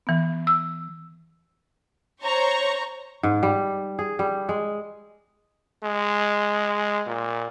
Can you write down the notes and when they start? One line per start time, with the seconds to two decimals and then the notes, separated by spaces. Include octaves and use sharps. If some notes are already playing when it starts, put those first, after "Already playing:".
0.07 E3 B3
0.47 E6
2.22 C5 C#5 A#5 C#6
3.23 G#2
3.43 G3
3.99 G#4
4.19 G3
4.49 G#3
5.84 G#3
7.07 A#2